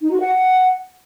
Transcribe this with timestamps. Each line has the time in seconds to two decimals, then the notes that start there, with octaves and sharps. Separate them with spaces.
0.01 D#4
0.11 F#4
0.21 F#5